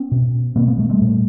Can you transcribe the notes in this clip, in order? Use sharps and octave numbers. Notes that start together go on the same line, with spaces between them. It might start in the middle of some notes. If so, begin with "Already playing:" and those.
Already playing: B3 C#4
B2
B2 A#3 C4
A3 B3
G#3 A#3
G3 A3
A#2